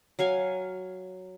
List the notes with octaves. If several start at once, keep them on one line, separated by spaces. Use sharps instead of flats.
F#3 F5 G#5